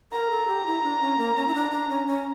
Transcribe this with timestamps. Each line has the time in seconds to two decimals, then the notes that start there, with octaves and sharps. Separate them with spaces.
0.12 A#4 A#5
0.30 A4
0.47 G4
0.66 E4
0.83 D4
1.01 C#4
1.18 A#3
1.36 C#4
1.47 E4
1.54 D4
1.71 D4
1.89 C#4
2.07 C#4